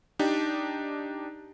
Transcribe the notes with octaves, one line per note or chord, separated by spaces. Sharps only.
D4 D#4 G4